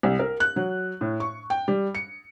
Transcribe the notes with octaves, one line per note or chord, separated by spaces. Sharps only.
C2
A#4
F#6
F#3
A2
C#6
G5
G3
C#7